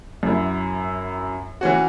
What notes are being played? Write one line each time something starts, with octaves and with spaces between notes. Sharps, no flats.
F#2 F#3 E4
E3 C#4 F#4